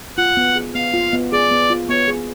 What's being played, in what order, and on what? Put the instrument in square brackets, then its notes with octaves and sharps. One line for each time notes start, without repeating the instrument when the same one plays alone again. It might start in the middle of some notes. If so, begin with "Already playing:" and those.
[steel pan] F4 [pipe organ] F#5
[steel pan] B3
G#4
[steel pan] B3 [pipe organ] F5
[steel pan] F4
B3
[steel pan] G#4 [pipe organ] D5
[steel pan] B3
F4
[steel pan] B3 [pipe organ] C#5
[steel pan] G#4